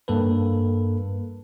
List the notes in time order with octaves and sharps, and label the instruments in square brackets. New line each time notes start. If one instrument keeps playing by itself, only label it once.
[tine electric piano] G2 A#3 A4 B4